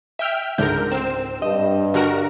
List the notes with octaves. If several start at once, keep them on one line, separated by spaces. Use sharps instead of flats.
E5 G5 F6
C#2 G#2 D3 A#4 G6
C4 E7
G2 D#5
D3 F#4 A#4